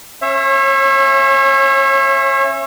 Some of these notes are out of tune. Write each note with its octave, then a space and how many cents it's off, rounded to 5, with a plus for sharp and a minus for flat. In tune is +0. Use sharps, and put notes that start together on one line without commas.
C#4 -15 C#5 -35 E5 +20